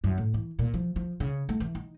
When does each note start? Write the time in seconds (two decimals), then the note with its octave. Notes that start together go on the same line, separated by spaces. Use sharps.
0.04 F#2
0.18 A2
0.34 E3
0.59 A#2
0.74 F3
0.96 F3
1.20 C#3
1.49 A3
1.60 E3
1.75 D#4